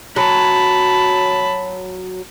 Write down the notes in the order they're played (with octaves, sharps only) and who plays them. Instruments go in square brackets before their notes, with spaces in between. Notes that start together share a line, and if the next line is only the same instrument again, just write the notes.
[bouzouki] F#3 [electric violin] A5 B5